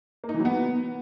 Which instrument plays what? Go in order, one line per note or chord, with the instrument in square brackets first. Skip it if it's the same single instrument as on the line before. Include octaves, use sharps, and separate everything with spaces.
[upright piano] A#3
D#4
E3
F#3
B3